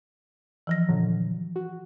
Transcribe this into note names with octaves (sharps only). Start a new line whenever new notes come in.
E3 F3 A#6
A#2 D3 F#3
F#4